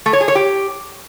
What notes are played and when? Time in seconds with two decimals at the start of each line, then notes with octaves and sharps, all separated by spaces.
0.06 A3
0.13 C#5
0.21 G#4
0.28 C#5
0.35 G4